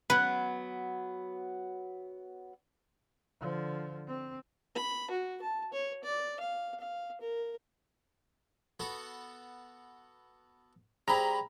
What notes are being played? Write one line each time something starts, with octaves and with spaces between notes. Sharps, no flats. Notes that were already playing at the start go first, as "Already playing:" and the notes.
F#3 B3 B4
D3 F3
C4
B5
F#4
A5
C#5
D5
F5
F5
A#4
B3 F#4 A4
G3 C4 G#4 A#5 B5